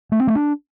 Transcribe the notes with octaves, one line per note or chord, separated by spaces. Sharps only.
A3
C4
A3
D4